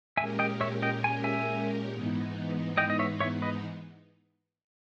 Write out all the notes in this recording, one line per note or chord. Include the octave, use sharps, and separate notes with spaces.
A#2 G#3 C#4 G4 A#4 E5 G#5
D#5 G5
C#5 E5
D#5 G5
G#5
E5 G#5
G#2 E3 G#3 B3 D#4
D#5 G5
D#5
C#5 E5
C#5 E5
B4 D#5